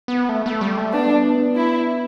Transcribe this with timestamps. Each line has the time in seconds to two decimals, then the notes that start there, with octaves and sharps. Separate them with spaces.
0.08 B3
0.29 A3
0.46 A3
0.61 G3
0.77 A3
0.93 B3 D4
1.56 E4